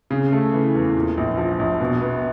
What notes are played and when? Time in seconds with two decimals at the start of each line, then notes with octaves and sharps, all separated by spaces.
0.10 C#3
0.32 A3
0.53 E3
0.75 E2
0.96 A#2
1.17 A#1
1.37 F3
1.59 A#1
1.81 B2
2.01 B3